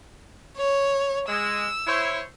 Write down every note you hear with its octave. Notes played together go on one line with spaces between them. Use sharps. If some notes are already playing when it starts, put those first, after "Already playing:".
C#5
G#3 E6
E4 C5 C#5